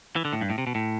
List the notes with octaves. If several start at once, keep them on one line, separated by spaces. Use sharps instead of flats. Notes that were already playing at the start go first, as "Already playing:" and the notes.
E3
D3
A2
G2
A2
C3
B2
A2